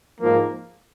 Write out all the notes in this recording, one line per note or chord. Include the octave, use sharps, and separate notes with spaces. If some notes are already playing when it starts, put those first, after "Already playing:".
G#2 F3 A#3